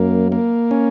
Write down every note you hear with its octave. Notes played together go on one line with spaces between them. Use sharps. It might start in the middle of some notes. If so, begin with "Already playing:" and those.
Already playing: F#2 A#3
A#3
C#4